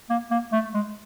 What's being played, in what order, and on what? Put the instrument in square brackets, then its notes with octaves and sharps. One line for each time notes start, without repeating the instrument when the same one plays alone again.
[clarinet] A#3
A#3
A3
G#3